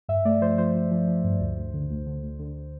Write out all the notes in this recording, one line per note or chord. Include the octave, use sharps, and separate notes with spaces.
G2 E5
A3 D5
F3 C5
F3 C5
F3
F3
F3
G2
D2
D2
D3
D2
D3
D2
D3